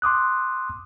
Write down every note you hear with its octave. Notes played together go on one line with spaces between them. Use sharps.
C6 D6 D#6 F#6